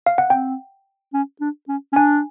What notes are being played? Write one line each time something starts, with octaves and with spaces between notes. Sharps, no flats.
F5
F#5
C4 G5
C#4
D4
C#4
C#4
D4 G#5